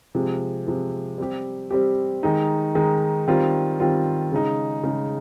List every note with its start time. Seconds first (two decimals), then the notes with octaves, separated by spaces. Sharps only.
0.15 C3 F3 G#3
0.67 C3 F3 G#3
1.18 G3 C4 G4
1.70 G3 C4 G4
2.23 D#3 G#3 D#4
2.75 D#3 G#3 D#4
3.28 D#3 G3 C4 F4
3.80 D#3 G3 C4 F4
4.32 C#3 G#3 D#4
4.83 C#3 G#3 D#4